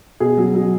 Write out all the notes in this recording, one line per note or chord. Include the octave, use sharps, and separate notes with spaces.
B2 G#4
F#3
F#3